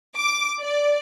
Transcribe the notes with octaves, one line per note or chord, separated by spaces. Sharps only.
D6
D5